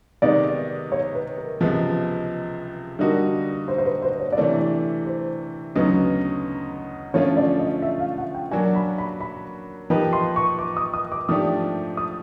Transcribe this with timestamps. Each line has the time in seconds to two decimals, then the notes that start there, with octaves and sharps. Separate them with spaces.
0.22 C3 D#3 G#3 B3 D#4 D5
0.92 C#5
1.14 B4
1.38 A#4
1.61 C#2 C3 F3 G#3 B3
2.99 D3 G3 A#3 D#4 F#4
3.68 C5
3.78 C5
3.85 B4
4.02 C5
4.20 C#5
4.32 D5
4.37 C3 E3 A3 D4 C#5
5.06 C5
5.75 D2 C#3 F#3 B3 D#4 B4
7.14 D3 F3 A3 C#4 F4 C#5
7.37 D5
7.59 D#5
7.82 E5
8.00 F5
8.18 F#5
8.34 G5
8.51 F#3 A#3 D4 F#4 G#5
8.75 B5
8.98 B5
9.20 B5
9.90 F3 A#3 D#4 G4 B4
10.13 C6
10.36 C#6
10.59 D6
10.77 D#6
10.93 D#6
11.12 D6
11.29 G#2 F3 A3 D4 G4 D#6
11.97 D#6